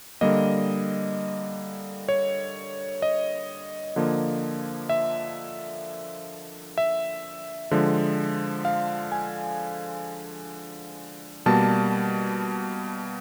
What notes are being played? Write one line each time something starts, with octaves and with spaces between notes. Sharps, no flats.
D3 G3 A#3 D#5
C#5
D#5
D3 F3 A#3
E5
E5
D3 F3 G#3
F5
G#5
B2 G3 A#3 A5